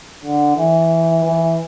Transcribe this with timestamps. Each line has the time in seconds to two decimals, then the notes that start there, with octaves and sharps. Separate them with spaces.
0.24 D3
0.56 E3
1.24 E3